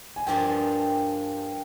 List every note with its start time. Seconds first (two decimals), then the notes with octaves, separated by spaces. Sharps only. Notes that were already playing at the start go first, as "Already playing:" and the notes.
0.16 G#5
0.27 G2 F3 A#3 D4 G#4 G5